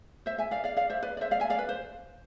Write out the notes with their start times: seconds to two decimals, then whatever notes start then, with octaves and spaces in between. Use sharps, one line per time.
0.26 C5 E5
0.38 E5 G#5
0.51 D5 F5
0.64 D5 F5
0.77 D5 F5
0.90 C5 E5
1.03 B4 D5
1.17 D5
1.21 C5 E5
1.31 D5 F5
1.40 E5 G#5
1.50 D5 F5
1.59 B4
1.69 C5